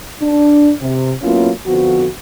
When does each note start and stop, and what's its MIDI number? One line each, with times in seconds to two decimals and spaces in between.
0.22 0.70 62
0.81 1.11 48
1.21 1.50 54
1.21 1.50 58
1.21 1.50 59
1.21 1.50 61
1.21 1.50 64
1.21 1.50 65
1.66 2.07 41
1.66 2.07 50
1.66 2.07 53
1.66 2.07 59
1.66 2.07 66